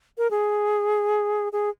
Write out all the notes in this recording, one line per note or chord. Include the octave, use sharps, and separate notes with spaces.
A#4
G#4
G#4